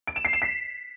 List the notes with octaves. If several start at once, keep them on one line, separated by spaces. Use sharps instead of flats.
D7
E7
C7
E7
B6